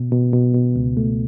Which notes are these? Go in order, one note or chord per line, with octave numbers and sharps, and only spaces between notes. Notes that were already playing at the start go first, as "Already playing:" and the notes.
Already playing: B2
B2
B2
B2
C#2
A3